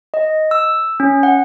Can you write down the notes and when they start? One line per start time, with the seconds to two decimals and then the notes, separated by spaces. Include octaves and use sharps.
0.14 D#5
0.51 E6
1.00 C#4
1.23 F#5